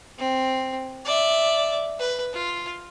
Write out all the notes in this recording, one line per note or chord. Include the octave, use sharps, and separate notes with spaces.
C4
D5 E5
B4
F4